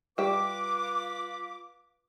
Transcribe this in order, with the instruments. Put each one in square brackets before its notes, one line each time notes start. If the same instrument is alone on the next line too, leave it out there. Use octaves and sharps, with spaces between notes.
[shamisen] G3 E5 G5 [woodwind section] F4 B4 D6